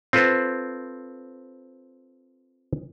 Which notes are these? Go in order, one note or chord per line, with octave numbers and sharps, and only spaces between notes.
C4 F4 A4 B4 C5